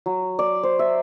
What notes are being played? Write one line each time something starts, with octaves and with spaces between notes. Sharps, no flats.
F#3
D5
C5
E5